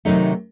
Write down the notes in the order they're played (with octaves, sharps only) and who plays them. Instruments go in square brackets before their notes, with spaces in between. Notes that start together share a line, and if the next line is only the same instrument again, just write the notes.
[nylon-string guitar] C3 D#3 F#3 A3 D#4